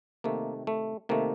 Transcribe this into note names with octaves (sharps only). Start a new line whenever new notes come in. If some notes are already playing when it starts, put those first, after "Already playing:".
C3 D#3 A3 A#3
A3
C3 D#3 A3 A#3